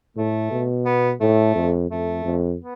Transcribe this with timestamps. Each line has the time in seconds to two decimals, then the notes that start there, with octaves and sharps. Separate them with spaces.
0.17 A2 A3
0.51 B2
0.86 B3
1.20 A2 A3
1.55 F2
1.90 F2 A3
2.25 F2
2.60 B3